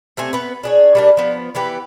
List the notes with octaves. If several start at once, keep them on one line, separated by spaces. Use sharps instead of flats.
C3 A3 C4 G#5
B3 B4
D4 G#4 C#5
G3 A#3 D4
F3 B3
E3 B3 G4 B4